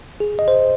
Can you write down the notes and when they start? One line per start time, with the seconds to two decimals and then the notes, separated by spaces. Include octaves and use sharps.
0.20 G#4
0.39 D#5
0.48 C5